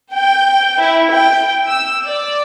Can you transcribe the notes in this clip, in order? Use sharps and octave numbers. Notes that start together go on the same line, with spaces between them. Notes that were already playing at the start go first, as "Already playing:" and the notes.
G5
E4
G5
E6
D5